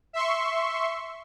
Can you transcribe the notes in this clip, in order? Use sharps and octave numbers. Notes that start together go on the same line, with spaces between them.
E5 C6 C#6